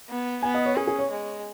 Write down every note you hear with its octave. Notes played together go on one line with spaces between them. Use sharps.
B3
B3 G#5
D#5
C#5
C#4 G#4
G#4
C#5
G#3